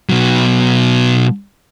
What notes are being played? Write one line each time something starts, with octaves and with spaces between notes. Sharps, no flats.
B2 F#3